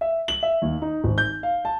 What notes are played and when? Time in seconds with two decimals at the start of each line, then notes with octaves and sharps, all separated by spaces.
0.01 E5
0.28 F#7
0.43 E5
0.62 D#2
0.82 D#4
1.04 G#1
1.18 G6
1.43 F5
1.65 A5